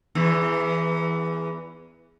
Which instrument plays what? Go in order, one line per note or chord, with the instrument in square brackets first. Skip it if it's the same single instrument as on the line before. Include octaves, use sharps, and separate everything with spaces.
[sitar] E2 E3